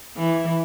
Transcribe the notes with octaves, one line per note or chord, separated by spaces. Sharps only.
E3